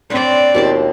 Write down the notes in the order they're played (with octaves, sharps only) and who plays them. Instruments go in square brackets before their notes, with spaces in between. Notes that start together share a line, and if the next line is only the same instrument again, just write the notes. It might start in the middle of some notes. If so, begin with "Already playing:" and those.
[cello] C4 D5 [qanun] D4 B4 C#5
[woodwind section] D#2 [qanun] B2 F3 A5